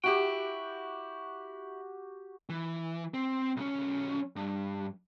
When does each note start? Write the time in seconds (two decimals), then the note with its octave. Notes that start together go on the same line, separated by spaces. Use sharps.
0.04 E4 F#4 G4 G5
2.49 E3
3.14 C4
3.56 B1 C#4
4.36 G2